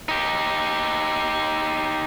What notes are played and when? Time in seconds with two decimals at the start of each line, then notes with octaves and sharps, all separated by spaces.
0.09 D#4 G4